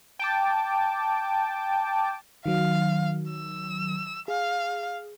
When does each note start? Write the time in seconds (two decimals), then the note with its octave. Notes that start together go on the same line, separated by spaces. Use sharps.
0.19 G5 A5 D6
2.46 D#3 F#3 F5
3.30 E6
4.28 G#4 F5